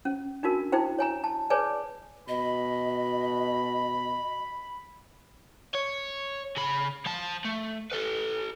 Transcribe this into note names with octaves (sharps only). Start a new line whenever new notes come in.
C#4
D4 D#4 F#4 A#4
D#4 E4 C5 G5
C#5 G#5 A#5
A5
G#4 B4 C#5 D5 G#5 A5
B2 D#5 B5
C#5
C#3 B5
F3 A5
A3
A4 B4